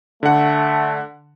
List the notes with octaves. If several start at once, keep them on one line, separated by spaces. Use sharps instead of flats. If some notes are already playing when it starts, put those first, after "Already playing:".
D3 A3 F#5